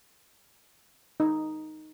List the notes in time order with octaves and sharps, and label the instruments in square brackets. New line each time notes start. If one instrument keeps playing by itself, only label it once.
[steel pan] D#4